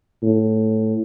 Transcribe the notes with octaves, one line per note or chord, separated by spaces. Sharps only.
A2